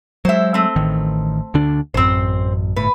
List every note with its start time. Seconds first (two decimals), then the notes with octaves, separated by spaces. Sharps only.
0.25 F#3 G#3 C5 E5
0.54 A3 C4
0.76 A1 D#3
1.54 D2 D3 D4
1.94 A1 F#2 C4 C5
2.76 G1 A2 B4